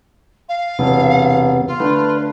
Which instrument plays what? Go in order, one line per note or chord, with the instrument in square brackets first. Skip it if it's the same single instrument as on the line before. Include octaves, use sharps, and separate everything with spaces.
[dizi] F5
[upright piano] E1 [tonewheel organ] C3 B3
[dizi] F4
[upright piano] D3 A3 [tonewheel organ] B4